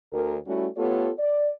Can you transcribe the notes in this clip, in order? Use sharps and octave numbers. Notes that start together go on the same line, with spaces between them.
D2 A#4
G3 A3 C#4 E4 F#4
A3 B3 F4 G4 A4 C#5
D5